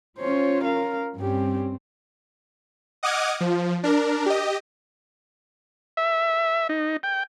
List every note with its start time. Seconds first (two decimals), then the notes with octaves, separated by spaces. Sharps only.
0.19 C#4 F4 C5 C#5
0.64 A#4 F5
1.17 G2 C4 C#4 G4
3.03 D#5 F#5 D6 D#6 F6 G#6
3.40 F3
3.83 D4 A#4
4.26 G4 D#5
5.97 E5
6.69 D#4
7.03 G5